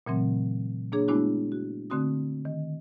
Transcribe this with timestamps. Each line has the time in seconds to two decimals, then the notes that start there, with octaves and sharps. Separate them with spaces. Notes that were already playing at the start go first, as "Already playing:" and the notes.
0.06 A#2 C#3 E3 F#3 A3 C4
0.92 A#3 D4 G#4 C#5
1.08 G#3 A3 B3 D4 E4 F#4
1.52 F#4
1.90 D3 A3 C4 F#4 D#6
2.45 D#3